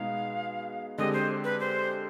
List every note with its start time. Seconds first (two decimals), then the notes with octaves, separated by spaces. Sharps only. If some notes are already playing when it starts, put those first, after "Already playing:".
Already playing: B2 G#3 B3 D#4 G#4 F5
0.98 D3 G#3 C4 G4 D#5
1.13 C5
1.44 B4
1.60 C5